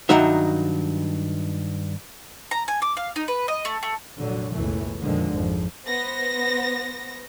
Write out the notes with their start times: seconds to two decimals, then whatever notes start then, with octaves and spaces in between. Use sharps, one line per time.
0.09 G2 D#3 F#3 D#4 E5
2.51 A#5
2.68 G#5
2.82 D6
2.97 F5
3.16 D#4
3.28 B4
3.48 D#5
3.65 A3
3.83 A3
4.17 F1 F2 A#2 D3 F#3
4.53 F#1 C#2 F#2 B2 E3 A3
5.00 F2 A#2 D3 D#3 F3 G#3
5.30 G#1 F2 F3
5.87 B3 C5 A#6